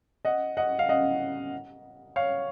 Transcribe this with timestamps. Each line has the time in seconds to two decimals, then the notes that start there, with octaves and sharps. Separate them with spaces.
0.25 D#5 F#5
0.57 D#5 F#5
0.79 F5
0.89 D#5 F#5
2.16 C#5 F5